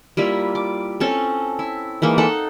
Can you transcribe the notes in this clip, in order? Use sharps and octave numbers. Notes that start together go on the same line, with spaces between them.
G3 A#3 E4 F4
D6
C4 C#4 A4
E4
E3 G#3 A#3 D#4
D#4 A4 F#5